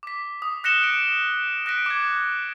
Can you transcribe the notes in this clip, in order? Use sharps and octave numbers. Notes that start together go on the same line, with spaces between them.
D6 B6
D#6
F#6 A#6 C#7 E7 G7
F#6 D7
F#6 A#6 B6 D7
D6 G#6